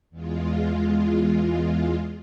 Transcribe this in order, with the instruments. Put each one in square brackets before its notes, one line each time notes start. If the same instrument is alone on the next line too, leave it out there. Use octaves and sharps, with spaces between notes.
[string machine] E2 G#3 F4